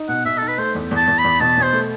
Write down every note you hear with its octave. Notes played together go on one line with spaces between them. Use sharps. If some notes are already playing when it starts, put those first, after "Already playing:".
Already playing: D#4
B2 F#5
B2 E5
D#4 A4
B4
A3 C5
E2
E2
A5
E2
B5
E2
B2 A5
B2 C5
A3